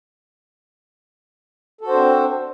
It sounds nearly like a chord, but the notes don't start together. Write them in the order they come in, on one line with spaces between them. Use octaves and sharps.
A4 F#4 C5 D4 C4